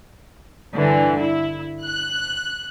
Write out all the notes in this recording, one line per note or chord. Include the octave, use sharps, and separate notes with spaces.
G2 D3 E3
E4
F#6